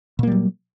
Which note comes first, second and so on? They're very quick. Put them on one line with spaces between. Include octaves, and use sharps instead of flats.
A#2 A#3 G3 F#3